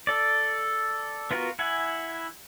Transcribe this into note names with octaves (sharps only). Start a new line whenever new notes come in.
A4 D5
B3 F4 F#4 A#4
E4 F#5 G#5